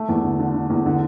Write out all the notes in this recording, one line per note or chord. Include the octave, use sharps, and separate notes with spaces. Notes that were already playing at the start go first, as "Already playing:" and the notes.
Already playing: A3
E2
D3
D3
D3
E2
D3